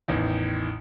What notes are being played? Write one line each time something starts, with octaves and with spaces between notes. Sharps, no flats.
A1 E2 D#3